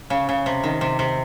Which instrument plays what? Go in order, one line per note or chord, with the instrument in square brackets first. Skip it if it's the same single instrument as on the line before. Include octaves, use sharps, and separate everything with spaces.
[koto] C#3
C#3
C3
D#3
C3
C3